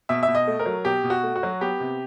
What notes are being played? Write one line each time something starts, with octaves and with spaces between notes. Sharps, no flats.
B2 E5
E5
B2
D#5
A3
A#4
F#3
B2 G4
B2
F#4
A3
F#4
F#3
B3 G4
C3